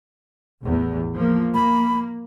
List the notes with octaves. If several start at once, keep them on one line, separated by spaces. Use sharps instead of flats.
A1 E2
F3 A#3
A#3 B5